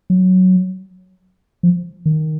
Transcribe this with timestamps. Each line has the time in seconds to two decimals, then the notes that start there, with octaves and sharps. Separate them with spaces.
0.10 F#3
1.63 F3
2.06 D#3